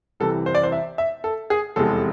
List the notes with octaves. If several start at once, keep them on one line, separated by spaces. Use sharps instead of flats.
C2 C3 E3 A4
C5
D5
C5
E5
E5
A4
G#4
F1 E2 C3 G#3 A4